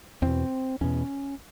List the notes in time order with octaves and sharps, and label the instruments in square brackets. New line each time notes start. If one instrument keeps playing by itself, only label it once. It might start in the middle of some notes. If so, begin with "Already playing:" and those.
[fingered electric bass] E2 B2 C4
E2 B2 C#4